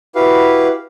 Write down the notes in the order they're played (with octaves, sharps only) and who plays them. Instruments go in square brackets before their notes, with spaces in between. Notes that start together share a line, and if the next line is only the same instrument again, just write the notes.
[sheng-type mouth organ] E4 F#4 G4 B4 F5